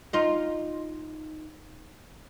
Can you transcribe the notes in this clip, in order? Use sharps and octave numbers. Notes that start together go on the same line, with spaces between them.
D#4 F4